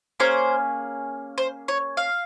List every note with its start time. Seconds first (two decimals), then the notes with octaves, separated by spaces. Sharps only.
0.20 A#3 C#4 G#4 C5
1.38 C5
1.68 C#5
1.97 F5